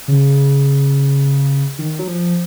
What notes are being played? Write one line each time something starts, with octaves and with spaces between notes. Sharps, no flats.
C#3
D#3
F#3
F3